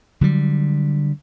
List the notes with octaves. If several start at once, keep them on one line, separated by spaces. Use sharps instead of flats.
D3 F#3 G3